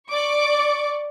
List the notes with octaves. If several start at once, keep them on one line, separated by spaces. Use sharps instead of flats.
D5 C#6 D6